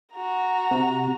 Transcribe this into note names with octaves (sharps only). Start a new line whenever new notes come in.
F#4 A#5
C3